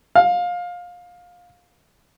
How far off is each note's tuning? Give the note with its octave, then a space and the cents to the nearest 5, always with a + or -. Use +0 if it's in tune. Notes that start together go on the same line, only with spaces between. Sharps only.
F5 +20